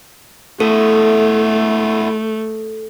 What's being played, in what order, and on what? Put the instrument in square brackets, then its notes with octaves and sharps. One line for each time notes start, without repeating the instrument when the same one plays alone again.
[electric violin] A3 [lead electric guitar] E4 F#4 [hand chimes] A4